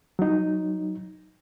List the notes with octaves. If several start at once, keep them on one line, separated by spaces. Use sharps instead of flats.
F#3 D#4